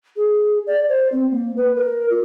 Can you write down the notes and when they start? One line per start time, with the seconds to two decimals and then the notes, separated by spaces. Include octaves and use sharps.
0.16 G#4
0.67 D5
0.89 C5
1.12 C4
1.32 A#3
1.56 B4
1.76 A#4
2.10 F4